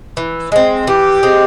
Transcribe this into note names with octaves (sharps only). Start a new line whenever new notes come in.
E3
G#3 C4
E3 G4
G#3 C4